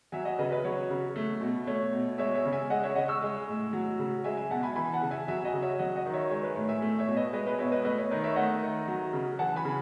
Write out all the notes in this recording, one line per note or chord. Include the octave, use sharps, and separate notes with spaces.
F#3 E5 G#5
D#5 F#5
C#3 B4 D#5
B4 D#5
F#3 C#5
C#3
A3
B2
A3 C#5
B2
G#3 C#5 E5
C#5 E5
C#3
E5 G#5
G#3 D#5 F#5
C#5 E5
C#3 D#5 F#5
C#6 E6
G#3
A2
F#3
C#3
G#3 E5 G#5
E5 G#5
B2 F#5 A5
G#5 B5
E3 G#5 B5
F#5 A5
C#3
E5 G#5
F#3 E5 G#5
D#5 F#5
C#3
C#5 E5
F#3 D#5 F#5
D#5 F#5
D#3
C#5 E5
G#3 C#5
B4
A2 C#5
E5 G#5
A3
C#5 E5
B2
B4 D#5
G#3 B4 D#5
B4 D#5
B2 C#5 E5
B4 D#5
A3 B4 D#5
C#5
D#3 B4 D#5
C#5 E5
A3 D#5 F#5
D#3
F#3
C#3
E3 F#5 A5
G#5 B5
C#3